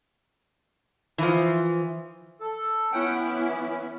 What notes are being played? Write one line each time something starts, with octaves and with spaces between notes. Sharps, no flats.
E3 F3
A4
B3 C#4 E4 F#5 G5
E3 C#4